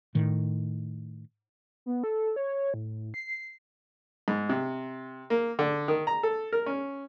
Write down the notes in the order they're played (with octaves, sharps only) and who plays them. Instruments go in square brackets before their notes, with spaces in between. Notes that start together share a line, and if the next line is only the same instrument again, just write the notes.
[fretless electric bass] A2 D#3
[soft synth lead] B3
A4
C#5
A2
C7
[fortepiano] G#2
C3
A#3
D3
D#3
A#5
A4
A#4
C#4